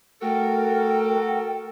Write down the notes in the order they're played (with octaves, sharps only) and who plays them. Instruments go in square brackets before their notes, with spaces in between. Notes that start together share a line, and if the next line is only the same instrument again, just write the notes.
[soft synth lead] A3 [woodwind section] F#4 A4 A#4 [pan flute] G5